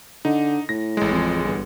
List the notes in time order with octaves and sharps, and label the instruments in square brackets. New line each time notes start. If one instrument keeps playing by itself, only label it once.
[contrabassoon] D3 [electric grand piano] D#4
[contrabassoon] A2 [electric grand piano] A#6
[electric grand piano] A1 G#3
[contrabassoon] F2
G1